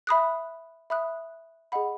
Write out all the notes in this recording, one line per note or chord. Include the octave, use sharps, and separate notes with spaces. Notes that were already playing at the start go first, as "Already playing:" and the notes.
E5 B5 D#6 F#6
E5 B5 D#6 F#6
G#4 D#5 F#5 B5